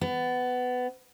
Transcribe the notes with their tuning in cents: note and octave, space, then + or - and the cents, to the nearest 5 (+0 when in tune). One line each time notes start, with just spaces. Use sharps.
B3 +20